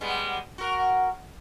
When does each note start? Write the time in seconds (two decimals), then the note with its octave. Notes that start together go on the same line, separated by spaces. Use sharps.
0.01 G3 G#3 B3
0.58 F#4 A#4